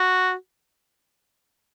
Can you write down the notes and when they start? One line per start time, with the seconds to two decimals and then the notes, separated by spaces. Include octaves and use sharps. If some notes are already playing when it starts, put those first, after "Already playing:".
Already playing: F#4